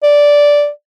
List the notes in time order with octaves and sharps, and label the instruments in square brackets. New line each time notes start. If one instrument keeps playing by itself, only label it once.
[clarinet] D5